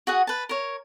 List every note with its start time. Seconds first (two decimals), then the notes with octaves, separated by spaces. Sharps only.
0.07 F#4 G#4 F#5
0.27 B4 A5
0.49 A#4 C#5